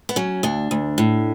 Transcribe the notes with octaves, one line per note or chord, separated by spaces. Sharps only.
B3
F#3 C#4
D2 D4
D2
A2